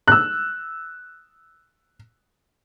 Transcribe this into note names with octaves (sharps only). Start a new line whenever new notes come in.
E6 F#6